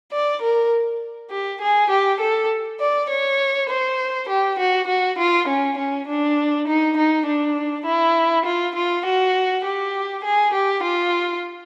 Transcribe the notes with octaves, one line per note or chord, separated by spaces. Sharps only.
D5
A#4
G4
G#4
G4
A4
D5
C#5
C5
G4
F#4
F#4
F4
C#4
C#4
D4
D#4
D#4
D4
E4
F4
F4
F#4
G4
G#4
G4
F4